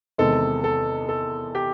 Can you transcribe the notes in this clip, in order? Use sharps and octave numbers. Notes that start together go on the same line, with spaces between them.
E2 C3 D#3 G#3 A4
A4
A4
G4